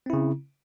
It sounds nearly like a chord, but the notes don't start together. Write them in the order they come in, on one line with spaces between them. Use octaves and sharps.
C4 E4 C#3